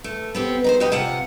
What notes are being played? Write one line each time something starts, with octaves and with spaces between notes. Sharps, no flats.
A3
B3 C4 G4
D#4 B4 C5
F2 B2 F#4 G4 D#5
C3 F3 F4 F#5